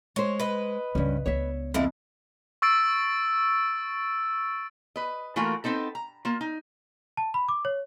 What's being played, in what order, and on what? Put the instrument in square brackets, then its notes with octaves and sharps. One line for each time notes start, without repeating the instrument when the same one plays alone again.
[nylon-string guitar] G#3 C5 [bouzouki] C#5
[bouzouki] B4 D#5
[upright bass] C#2 F3 [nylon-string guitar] G2 C#4
[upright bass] C#2 B3 [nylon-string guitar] C#5 E5
[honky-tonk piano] F2 [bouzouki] D3 A#3 E4
[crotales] C#6 E6 A6 D7
[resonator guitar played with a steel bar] B4 D#5
E3 A3 A#3 F4 F#4 A#4
B3 C4 D#4 A4
A#5
A#3 F4
D#4
[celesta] A5
B5
D6
C#5